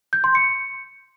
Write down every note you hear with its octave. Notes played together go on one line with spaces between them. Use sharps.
G6
C6
C#7